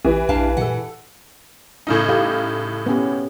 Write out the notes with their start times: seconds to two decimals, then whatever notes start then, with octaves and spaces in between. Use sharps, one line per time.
0.05 A1 E3 G4
0.29 A#1 D4 F5 A5
0.57 A#2 A4 F#5
1.87 A2 C#3 D#4
2.09 G4 F5
2.86 B3 C#4 G4